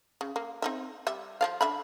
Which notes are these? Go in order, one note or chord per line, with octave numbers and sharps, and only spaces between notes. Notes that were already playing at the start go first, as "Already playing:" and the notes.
C#3
A#3
C4 D#4 E5
G3 E5
F3 D5 F5
D3 E5 B5